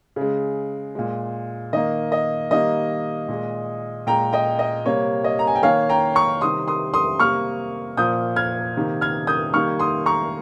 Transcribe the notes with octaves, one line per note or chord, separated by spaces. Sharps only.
C#3 G#3
A#2 G#3
D#3 A#3 D#5
D#5
D#3 G3 A#3 D#5
A#2 G#3
A#2 G#3 G5 A#5
D#5 G5
D#5
C3 G3 A#3 C#5
D#5
A#5
G#5
G5
D#3 A#3 C#5 F5
G5 A#5
A#5 C#6
C3 D#3 G3 C6 D#6
C6 D#6
C6 D#6
C3 G3 A#3 C#6 F6
A#2 F3 A#3 D#6 G6
F6 G#6
C3 D#3 A#3
F6 G#6
D#6 G6
D#3 G3 A#3 C#6 F6
C6 D#6
A#5 C#6